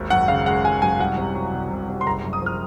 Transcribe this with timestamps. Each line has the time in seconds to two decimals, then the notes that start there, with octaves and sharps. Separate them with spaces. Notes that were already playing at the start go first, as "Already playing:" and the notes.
Already playing: G#1 D#2
0.10 F#2 F#5
0.28 C#3 F5
0.46 G#3 F#5
0.65 G#1 G#5
0.82 F#2 G#5
0.99 C2 F#5
1.18 C3
1.35 F#3
1.53 C2
1.71 C2
1.89 C3
2.01 C6
2.06 F#1 A#5
2.24 F#2
2.33 D#6
2.42 F3 F6